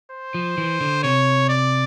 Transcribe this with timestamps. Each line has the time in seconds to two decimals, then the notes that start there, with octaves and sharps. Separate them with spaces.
0.12 C5
0.34 F3
0.58 E3
0.81 D3
1.03 C3 C#5
1.49 D5